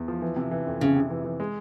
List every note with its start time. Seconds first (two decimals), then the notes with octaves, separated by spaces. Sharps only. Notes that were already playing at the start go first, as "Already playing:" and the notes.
Already playing: E2
0.08 F3
0.22 E3
0.36 C3
0.51 E3
0.67 F2
0.80 F2 C#3
0.96 C3
1.10 E3
1.24 E3
1.40 G#3